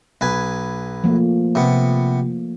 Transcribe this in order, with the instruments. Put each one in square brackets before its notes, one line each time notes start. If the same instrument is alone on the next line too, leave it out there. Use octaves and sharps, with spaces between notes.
[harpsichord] B1 B4 G#5
[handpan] F3 A3 A#3
[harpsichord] C3 B3